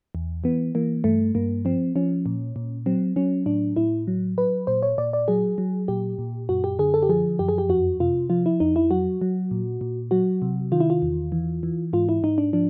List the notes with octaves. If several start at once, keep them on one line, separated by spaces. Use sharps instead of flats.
E2
E3 B3
E3 A#3
G2 A3
G2 A#3
F3 C4
F3 C#4
A#2
A#2
F#3 C4
F#3 C#4
A2 D4
A2 E4
F#3
F#3 B4
A#2 C5
C#5
A#2 D5
D5
F#3 G#4
F#3
A#2 G4
A#2
F#2 F#4
G4
D3 G#4
A4
G4
F3 G#4
F#2 G4
G#4
G4
F2 F#4
C3 F4
F3 F4
E4
F2 D#4
E4
F#3 F#4
F#3
A#2
A#2
F#3 F#4
C3
D#3 F4
E4
F4
E2
E3
E3
G#2 F4
E4
G#2 D#4
D4
F3 D4